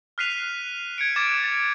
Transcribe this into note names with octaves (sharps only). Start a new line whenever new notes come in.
F6 F#6 B6 C7 D#7 F7
G#6 C#7 D7
D6 G#6 A6 E7
A6